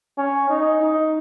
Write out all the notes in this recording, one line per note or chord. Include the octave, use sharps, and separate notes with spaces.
C#4
D#4
D#4